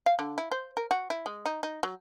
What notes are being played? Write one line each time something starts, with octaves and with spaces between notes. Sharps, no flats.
F5
D3
E4
C5
A#4
F#4
E4
G#3
D#4
D#4
F#3